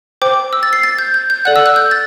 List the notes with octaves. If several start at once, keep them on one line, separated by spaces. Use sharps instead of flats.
C5 G5 D6
E6
A6
C7
A6
G6
G6
G6
A4 D5 F#5 F#6
E6
F#6
G6
A6